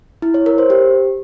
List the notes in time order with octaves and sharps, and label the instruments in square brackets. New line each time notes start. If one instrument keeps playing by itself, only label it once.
[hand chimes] E4
C#5
A#4
C5
G4